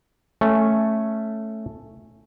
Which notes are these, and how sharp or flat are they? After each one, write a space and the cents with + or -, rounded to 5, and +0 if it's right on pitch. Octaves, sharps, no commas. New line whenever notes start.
A3 +0 C#4 +0